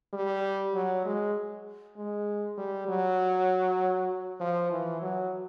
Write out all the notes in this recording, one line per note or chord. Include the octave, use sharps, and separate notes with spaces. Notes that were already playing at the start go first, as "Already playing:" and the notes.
G3
F#3
G#3
G#3
G3
F#3
F3
E3
F#3